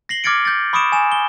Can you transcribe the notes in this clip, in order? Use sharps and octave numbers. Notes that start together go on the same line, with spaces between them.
A#6 C7 F#7 G7
D6 F6 G#6 A6 C#7 D7
G6 A6
B5 C#6 D#6 C#7 D7 E7
G#5 E7
G7